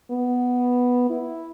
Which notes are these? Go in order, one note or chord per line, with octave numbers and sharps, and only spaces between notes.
B3
E4